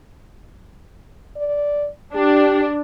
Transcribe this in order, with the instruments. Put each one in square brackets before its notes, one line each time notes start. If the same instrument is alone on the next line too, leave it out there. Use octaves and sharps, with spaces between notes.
[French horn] D5
[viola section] D4 [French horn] G4